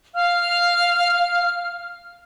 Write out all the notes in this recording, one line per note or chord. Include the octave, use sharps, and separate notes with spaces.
F5 F6